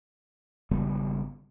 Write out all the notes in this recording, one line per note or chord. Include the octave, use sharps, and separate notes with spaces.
G#1 C#3 G3 B3